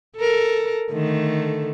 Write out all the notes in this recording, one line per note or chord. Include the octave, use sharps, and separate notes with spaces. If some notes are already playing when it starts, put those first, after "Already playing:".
A4 A#4
D3 D#3 A3